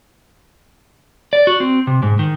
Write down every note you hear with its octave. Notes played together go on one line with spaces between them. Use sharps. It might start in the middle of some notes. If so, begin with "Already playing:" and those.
D5
F#4
C4
C3
G#2
D#3